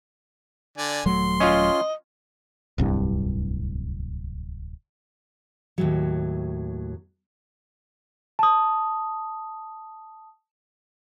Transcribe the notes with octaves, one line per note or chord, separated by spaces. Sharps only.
D3 D5 G#5
D#1 F#3 A3 C6
C#4 F4 D#5
D1 C2 G2
D#2 A2 F#3
A5 D#6